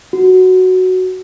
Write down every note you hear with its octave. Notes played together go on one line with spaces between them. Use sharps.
F#4